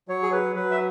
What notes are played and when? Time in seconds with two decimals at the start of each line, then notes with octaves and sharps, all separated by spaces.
0.08 F#3 C#5
0.23 G#4
0.32 B4
0.55 F#3 B4
0.71 E5